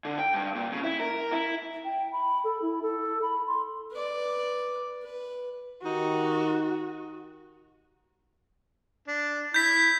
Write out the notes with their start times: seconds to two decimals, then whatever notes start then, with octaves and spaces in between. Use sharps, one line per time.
0.05 D3
0.19 G5
0.34 G2
0.55 A#2
0.72 C#3
0.84 E4
1.00 A#4
1.32 E4
1.85 G5
2.12 B5
2.44 A4
2.62 E4
2.82 A4
3.22 B5
3.47 C6
3.92 B4 D5
5.03 B4
5.83 D#3 D#4 F#4 G4
9.08 D4
9.54 E4 G6 B6